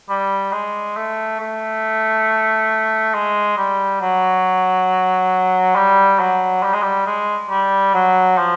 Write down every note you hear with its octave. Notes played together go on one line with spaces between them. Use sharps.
G3
G#3
A3
A3
G#3
G3
F#3
G3
F#3
G3
G#3
G3
G#3
G3
F#3
F3